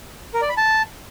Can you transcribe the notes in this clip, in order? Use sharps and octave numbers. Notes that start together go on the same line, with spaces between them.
A#4
D5
B5
A5